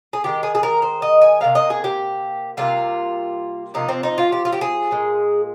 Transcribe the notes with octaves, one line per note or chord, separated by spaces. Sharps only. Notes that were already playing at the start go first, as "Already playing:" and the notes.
G#4
D#3 G#3 G4
G#4
G#4
A#4
C5
D#5
G#5
C3 G3 A#3 F5
D#5
G#4
G4
C3 G3 A#3 F4
C3 F3 A#3 D#4
C4
D#4
F4
G4
F4
G4
G#4
A#2 G#3